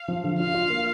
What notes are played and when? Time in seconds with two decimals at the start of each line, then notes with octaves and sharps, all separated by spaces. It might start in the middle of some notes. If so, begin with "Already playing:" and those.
Already playing: F5
0.08 F3
0.24 D3
0.39 F4 F5
0.55 F4
0.70 A#3